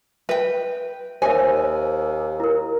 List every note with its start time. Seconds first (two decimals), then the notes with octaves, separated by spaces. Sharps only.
0.29 B4 E5 G5
1.22 D#2 C5 C#5 E5 G#5
2.40 E4 A#4